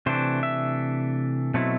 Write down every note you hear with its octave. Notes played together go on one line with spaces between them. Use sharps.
C3 E3 A3 D4 C5
E5
B2 F#3 A3 C4 E4